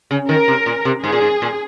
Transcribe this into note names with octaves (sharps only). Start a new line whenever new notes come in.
C#3
D#3 A#4
C3
A#2
C3
G#2 G#4
A#2
G#2
A#2